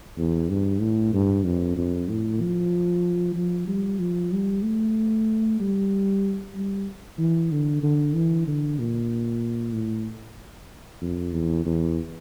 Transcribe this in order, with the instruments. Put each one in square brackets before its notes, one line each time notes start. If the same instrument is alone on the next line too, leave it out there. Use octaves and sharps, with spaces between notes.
[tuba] E2
G2
A2
G2
F2
F2
A2
F3
F3
G3
F3
G3
A3
G3
G3
E3
D3
D3
E3
D3
A#2
A2
F2
E2
E2